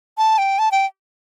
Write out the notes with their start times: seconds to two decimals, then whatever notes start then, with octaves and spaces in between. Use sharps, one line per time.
0.18 A5
0.38 G5
0.59 A5
0.72 G5